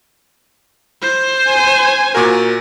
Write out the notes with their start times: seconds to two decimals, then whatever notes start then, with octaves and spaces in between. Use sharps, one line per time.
1.02 C5
1.47 G#5
2.14 A#2 F#4 A#4